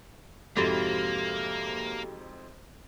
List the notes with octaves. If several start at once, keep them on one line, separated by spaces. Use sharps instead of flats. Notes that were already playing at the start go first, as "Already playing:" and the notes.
F2 G#2 C3 A#3 F#4 G4 A4